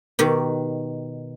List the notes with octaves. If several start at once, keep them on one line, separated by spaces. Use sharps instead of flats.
B2 D#3 G4